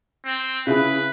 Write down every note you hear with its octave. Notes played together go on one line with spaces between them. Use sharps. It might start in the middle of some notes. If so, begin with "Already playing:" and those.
C4
C#3 E4 G#4 B4